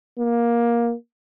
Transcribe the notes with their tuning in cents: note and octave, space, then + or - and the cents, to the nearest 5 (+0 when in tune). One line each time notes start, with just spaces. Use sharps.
A#3 +15